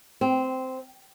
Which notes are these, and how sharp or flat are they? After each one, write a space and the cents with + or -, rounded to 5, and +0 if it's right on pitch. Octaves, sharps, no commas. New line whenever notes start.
C4 -10